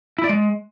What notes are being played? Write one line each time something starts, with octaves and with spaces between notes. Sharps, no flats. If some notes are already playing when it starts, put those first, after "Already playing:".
E4
D5
G#3